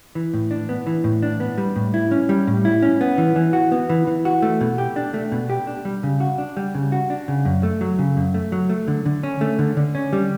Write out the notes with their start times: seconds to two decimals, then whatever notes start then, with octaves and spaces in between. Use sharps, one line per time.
0.15 E3
0.34 A2
0.51 D4
0.69 B3
0.87 E3
1.04 A2
1.22 D4
1.40 B3
1.58 G3
1.76 A2
1.94 E4
2.11 C#4
2.29 G3
2.47 A2
2.65 E4
2.82 C#4
3.01 B3
3.18 E3
3.36 E3
3.53 F#4
3.72 B3
3.90 E3
4.07 E3
4.25 F#4
4.42 A3
4.61 B2
4.78 G4
4.96 D4
5.14 A3
5.32 B2
5.50 G4
5.67 D4
5.85 G3
6.03 C#3
6.20 F#4
6.38 D4
6.57 G3
6.75 C#3
6.92 F#4
7.10 D4
7.28 C#3
7.45 F#2
7.63 A3
7.81 F#3
7.99 C#3
8.17 F#2
8.34 A3
8.52 F#3
8.70 A3
8.88 D3
9.06 D3
9.23 C#4
9.41 A3
9.59 D3
9.77 D3
9.95 C#4
10.13 G3